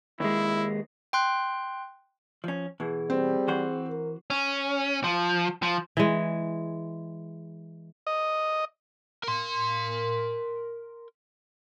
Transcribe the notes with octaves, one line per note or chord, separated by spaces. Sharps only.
D#2 G#3 E4
G5 C6 F#6
F3 C#4
B2 E3 G#4
G3 C4
E3 F#4 C5
A#4
C#4
F3
F3
E3 G#3
D#5
A#4 C6